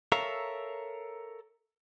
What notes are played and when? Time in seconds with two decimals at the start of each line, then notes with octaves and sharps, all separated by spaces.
0.12 A4 A#4 C#5 E5 F5 A#5